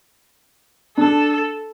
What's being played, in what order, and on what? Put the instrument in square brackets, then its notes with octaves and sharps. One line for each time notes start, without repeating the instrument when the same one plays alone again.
[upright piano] D4 [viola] A4